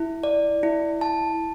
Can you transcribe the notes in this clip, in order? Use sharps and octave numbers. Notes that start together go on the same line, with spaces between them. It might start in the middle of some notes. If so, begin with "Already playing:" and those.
Already playing: E4
D5
E4
A5